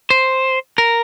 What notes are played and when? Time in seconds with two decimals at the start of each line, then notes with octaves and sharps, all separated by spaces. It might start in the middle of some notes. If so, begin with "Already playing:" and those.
0.10 C5
0.78 A#4